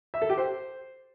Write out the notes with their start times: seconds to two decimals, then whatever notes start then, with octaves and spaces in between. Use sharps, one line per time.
0.14 E5
0.22 A4
0.30 G4
0.37 C5